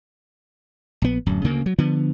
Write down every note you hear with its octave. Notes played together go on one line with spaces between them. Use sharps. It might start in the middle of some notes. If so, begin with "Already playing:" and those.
A#1 B3
D1 F#2
D2 C#3 A#3
F#3
D3 F3 B3